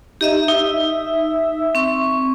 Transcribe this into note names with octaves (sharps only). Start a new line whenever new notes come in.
D#4 G4 D#5 E5
D#4 E5
C4 C#6